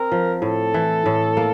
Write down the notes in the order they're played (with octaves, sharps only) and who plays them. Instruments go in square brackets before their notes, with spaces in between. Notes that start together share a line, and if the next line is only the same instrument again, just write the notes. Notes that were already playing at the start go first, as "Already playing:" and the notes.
Already playing: [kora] C4 [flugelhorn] A#4
[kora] F3
[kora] A2 [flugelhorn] A4
[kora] E3
A2
A#3